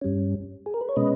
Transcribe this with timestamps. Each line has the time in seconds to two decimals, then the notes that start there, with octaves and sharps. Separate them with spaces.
0.01 G2 G3 C#4
0.66 G#4
0.74 A#4
0.81 B4
0.89 C#5
0.96 B2 G#3 C#4 B4 D#5